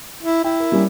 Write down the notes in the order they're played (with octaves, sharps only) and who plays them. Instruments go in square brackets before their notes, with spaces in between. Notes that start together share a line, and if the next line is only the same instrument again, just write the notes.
[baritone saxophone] E4
[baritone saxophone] E4 [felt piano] G5
[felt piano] A#4
G3 A#3 C#4